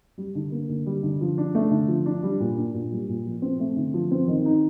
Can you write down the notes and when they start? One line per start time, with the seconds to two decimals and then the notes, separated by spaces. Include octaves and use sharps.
0.18 G3
0.35 D3
0.52 A#3
0.69 D3
0.86 G3
1.03 D3
1.21 F3
1.38 D4
1.55 A3
1.71 D3
1.88 F3
2.06 D4
2.23 G3
2.40 A#2
2.57 D4
2.74 A#2
2.92 G3
3.09 A#2
3.26 F3
3.42 C4
3.60 A3
3.76 D3
3.94 F3
4.11 C4
4.28 D#3
4.45 D#4